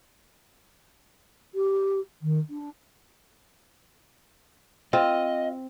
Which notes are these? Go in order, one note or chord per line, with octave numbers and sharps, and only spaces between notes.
G4
D#3
D4
C4 F4 D#5